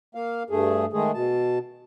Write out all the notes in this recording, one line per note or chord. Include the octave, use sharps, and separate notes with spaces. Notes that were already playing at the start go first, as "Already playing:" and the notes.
A#3 F5
G2 A3 G#4
D#3 G#3 A3 G#4
B2 A5